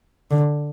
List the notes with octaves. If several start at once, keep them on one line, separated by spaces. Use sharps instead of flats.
D3